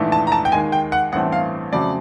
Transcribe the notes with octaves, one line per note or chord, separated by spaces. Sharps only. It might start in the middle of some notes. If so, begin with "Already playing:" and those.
Already playing: A#1 G#2 E3 A3
A5
A#5
A5
G5
D#2 D#3 G#3 G#5
G5
F#5
A1 G2 E3 A3 C4 F#5
F5
F2 C#3 F#3 A3 C4 D5